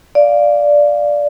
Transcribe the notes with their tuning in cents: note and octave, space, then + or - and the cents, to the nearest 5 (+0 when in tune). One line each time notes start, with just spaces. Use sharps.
D5 +0 F5 +0